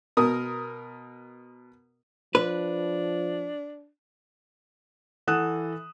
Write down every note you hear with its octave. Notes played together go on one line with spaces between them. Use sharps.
B2 A#4 D#6
F3 D4 B4
E3 A4 F#5 D#6 F#6 E7